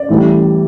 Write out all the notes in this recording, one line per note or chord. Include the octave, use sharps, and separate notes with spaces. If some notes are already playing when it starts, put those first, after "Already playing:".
Already playing: D5
A2 E3 G3